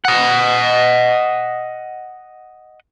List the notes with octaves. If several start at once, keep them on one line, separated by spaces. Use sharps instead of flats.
D#5 F#5